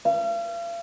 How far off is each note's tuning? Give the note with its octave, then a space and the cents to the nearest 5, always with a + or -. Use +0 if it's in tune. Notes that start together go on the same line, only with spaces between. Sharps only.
F5 -40